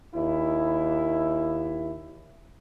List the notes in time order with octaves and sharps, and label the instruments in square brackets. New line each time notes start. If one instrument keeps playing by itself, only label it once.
[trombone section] D#2 E4